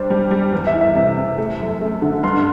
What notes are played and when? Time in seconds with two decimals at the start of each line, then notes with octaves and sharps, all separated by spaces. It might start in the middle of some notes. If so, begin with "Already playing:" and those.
Already playing: G3 D4 C5
0.10 G3
0.31 G3
0.52 E2
0.67 E5
0.74 E3
0.81 E5
0.95 C3 E5
1.16 C3
1.38 A3
1.59 F#2
1.81 A3
2.02 D3
2.23 G2 C6